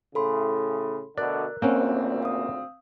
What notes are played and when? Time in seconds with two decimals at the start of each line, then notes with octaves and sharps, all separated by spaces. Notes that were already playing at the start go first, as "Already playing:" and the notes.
0.15 A2 C#3 A4 B5 C6
1.18 D2 B2 D3 A#4 D5 F#6
1.62 G#1 D2 A#2 A#3 C4 C#4 F#5
2.23 F5 D#6